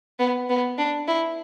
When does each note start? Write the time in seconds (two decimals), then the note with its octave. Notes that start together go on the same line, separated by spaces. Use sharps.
0.19 B3
0.50 B3
0.78 D4
1.08 E4